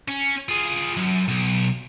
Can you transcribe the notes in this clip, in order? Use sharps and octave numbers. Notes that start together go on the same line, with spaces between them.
C#4
F4 G#4
F#2
B1